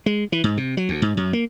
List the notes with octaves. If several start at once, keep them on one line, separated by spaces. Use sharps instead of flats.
G#3
E3
G#2
C3
F#3
D2
G#2
F#2
A#3